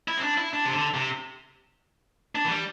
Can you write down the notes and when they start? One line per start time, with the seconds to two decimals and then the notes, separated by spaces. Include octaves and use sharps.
0.08 E4
0.18 C4
0.23 D4
0.38 E4
0.53 D4
0.65 C3
0.73 D3
0.94 C3
2.35 D4
2.44 E3
2.51 G3